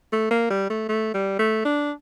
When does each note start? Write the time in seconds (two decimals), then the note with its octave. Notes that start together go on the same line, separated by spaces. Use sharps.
0.13 A3
0.31 A#3
0.50 G3
0.70 A3
0.89 A3
1.14 G3
1.39 A3
1.65 D4